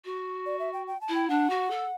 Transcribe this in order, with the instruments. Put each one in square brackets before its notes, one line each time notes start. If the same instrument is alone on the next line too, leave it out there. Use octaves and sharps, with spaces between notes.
[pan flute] F#4
[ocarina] D5
E5
G5
G5
A5
[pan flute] E4
[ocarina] G5
[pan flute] D4 [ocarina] F#5
[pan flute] F#4
A4